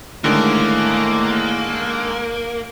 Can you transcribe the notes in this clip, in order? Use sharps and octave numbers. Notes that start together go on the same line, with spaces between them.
A2 D3 D#3 G#3 A#3